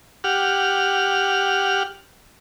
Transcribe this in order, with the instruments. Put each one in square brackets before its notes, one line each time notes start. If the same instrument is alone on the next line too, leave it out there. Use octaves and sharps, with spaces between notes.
[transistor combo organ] G4 F#5 F6